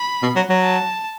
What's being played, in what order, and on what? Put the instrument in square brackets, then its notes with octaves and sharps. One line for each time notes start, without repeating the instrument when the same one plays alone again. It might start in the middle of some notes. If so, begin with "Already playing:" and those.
Already playing: [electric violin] B5
[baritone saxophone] B2
F#3
F#3
[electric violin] A5